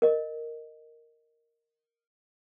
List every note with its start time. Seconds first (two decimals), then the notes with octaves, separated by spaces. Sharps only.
0.02 A#4 D#5